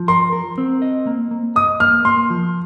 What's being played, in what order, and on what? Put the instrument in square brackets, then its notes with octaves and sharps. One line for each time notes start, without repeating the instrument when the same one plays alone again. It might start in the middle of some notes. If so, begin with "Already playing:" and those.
Already playing: [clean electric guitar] F3
[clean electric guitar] A#4 [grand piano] C6
[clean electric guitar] A#4
C4
D#5
A#3
A#3
[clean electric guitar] D#5 [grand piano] D#6
[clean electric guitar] A#3 [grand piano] F6
[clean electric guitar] A#3 [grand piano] C6
[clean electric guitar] F3